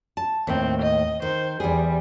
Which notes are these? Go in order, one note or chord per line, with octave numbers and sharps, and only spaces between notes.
A5
D#2 A2 C4
D#5
D#3 C5
E2 G3 G#4